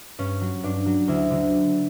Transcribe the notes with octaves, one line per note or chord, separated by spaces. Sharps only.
G2 C#4
F#3
G2 D4
F#3
D2 E4
D3 F#3